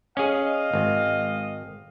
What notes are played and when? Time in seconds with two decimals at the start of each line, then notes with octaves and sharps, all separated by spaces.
0.17 C#4 G#4 D#5 F5
0.73 G#1